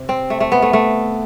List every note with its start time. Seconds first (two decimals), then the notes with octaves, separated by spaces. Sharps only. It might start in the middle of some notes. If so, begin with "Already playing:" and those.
Already playing: C3
0.09 C4
0.30 A3
0.40 A3
0.52 B3
0.62 A3
0.73 A3